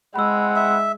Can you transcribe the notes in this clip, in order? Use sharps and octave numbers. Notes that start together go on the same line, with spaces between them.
G#3 C4 E4 F#5 B5 E6
E5